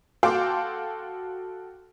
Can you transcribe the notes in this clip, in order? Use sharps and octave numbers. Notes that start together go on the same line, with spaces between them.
F#4 A4 F5 G5 C6 D6